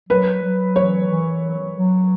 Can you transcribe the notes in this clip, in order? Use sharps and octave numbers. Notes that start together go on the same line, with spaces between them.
F#3 B4
F#3
E3 C#5
E3
F#3
F#3